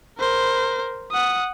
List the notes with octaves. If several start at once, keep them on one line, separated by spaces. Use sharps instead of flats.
A#4 C5
F#5 D#6